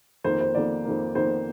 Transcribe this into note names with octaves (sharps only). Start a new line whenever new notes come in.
F2 D#3 A#3 C5
C5
F2 D#3 A#3 D5
F2 D#3 A#3
F2 D#3 A#3 C5